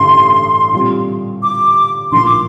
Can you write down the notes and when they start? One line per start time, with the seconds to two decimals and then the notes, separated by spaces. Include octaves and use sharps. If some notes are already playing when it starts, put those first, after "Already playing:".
Already playing: A1 G2 D3 A3 C6
0.73 A#2 G3 C4
1.43 D6
2.12 A#1 A2 F3 A#3 C6
2.25 D6